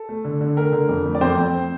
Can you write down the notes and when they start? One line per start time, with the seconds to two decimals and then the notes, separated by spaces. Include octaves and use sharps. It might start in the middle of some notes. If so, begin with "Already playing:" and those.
Already playing: A4
0.09 A3
0.25 D3
0.41 D3
0.57 A3 A#4
0.73 D3
0.89 F2
1.06 A3
1.15 D5
1.21 F2 C4 C5
1.38 F2
1.54 C4